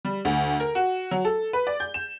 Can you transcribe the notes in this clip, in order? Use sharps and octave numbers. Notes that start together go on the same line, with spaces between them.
G3
D2
A#4
F#4
F#3
A4
B4
D5
G6
E7